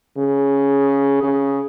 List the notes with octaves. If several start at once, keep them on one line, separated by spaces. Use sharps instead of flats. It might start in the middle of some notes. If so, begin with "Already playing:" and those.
C#3
C#3